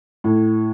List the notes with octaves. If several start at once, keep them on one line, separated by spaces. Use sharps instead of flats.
A2